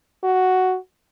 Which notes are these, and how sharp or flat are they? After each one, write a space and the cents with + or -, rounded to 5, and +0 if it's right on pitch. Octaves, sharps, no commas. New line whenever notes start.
F#4 +5